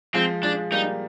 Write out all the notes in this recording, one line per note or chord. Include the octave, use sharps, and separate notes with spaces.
F3 G#3 C4
F3 G#3 D4
G3 A#3 D#4